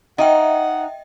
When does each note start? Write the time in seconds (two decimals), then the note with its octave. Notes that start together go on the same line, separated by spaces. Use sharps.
0.18 D#4 D#5 E5 F#5 G5